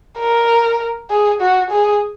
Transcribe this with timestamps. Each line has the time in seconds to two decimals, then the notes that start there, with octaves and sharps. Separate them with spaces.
0.19 A#4
1.10 G#4
1.41 F#4
1.71 G#4